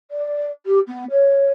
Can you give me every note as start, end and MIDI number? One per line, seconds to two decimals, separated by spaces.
0.11 0.46 74
0.66 0.79 67
0.87 1.05 59
1.11 1.51 73